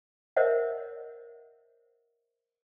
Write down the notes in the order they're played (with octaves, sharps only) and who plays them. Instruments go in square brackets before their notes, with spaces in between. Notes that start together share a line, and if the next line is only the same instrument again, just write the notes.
[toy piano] A#4 C5 C#5 D#5 E5 F#5